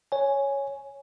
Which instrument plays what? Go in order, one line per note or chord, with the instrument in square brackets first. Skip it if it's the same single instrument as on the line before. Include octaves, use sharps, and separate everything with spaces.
[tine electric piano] C#5 G#5